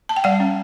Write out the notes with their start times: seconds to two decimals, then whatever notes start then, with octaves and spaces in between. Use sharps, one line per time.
0.09 A5
0.16 G5
0.24 G3 D5 F#5
0.40 C#4